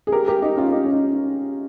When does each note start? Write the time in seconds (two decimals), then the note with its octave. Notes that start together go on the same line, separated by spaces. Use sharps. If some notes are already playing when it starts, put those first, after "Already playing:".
0.07 G#4
0.12 G4 A#4
0.27 G4 A#4
0.42 D#4 G4
0.57 C#4 F4
0.67 F4
0.72 D#4 G4
0.85 C#4
0.92 D#4